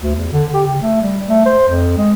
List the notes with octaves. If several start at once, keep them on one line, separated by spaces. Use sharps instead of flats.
D2
E2
D3
G4
C#3
A3
G3
A3
C5
F2
G#3